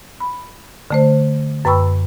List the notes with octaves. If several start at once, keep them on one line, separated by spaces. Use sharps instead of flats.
B5
D3 A3 C5
F#2 B4 G5 B5 C#6 E6